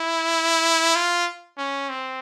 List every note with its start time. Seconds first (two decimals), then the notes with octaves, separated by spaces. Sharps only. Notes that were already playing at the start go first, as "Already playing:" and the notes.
Already playing: E4
0.95 F4
1.58 C#4
1.89 C4